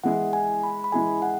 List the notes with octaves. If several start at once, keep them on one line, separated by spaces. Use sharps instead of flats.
E3 G#3 E4 G#4 F#5
G#5
B5
B5
E3 G#3 E4 G#4 G#5
F#5